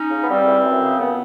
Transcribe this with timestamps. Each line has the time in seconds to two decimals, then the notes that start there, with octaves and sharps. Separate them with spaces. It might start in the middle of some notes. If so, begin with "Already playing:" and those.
Already playing: C#4 D#4
0.11 C#3
0.22 B3
0.28 G3 C4
0.47 E3
0.64 F#2
0.82 C#3
0.99 C#2 B3